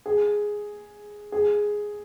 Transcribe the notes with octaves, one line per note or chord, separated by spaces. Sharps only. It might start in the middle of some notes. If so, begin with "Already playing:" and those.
G#4
G#4